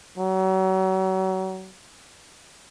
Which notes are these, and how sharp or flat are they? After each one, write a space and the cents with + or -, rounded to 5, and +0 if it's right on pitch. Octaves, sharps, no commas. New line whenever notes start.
F#3 +35